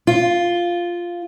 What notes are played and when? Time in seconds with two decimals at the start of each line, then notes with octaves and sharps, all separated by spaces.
0.07 F4